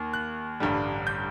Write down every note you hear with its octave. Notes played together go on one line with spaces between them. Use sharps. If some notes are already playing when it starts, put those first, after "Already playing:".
Already playing: D#2
F#6
A1 G2 D3 G3
G6